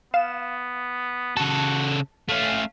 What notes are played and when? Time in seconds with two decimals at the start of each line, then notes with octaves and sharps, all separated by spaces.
0.14 B3 F5 E7
1.37 C#3 F#4 A4 A5
2.29 A3 C#4 F5